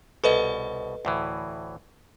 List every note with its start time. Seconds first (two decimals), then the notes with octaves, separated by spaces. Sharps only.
0.24 C2 B2 A4 B4 D#5
1.05 D2 A2 E3